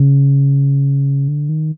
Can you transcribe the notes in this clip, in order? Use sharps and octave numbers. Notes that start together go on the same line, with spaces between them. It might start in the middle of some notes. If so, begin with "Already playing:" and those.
Already playing: C#3
D3
D#3